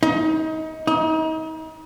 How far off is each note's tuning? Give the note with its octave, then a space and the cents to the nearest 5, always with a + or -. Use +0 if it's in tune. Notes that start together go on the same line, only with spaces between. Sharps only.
D#4 +25
D#4 +35